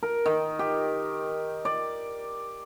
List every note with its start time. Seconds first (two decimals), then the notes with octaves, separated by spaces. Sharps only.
0.03 A#4
0.26 D#3
0.59 G4
1.65 D5